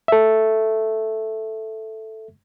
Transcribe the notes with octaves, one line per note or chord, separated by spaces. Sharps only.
A4 E5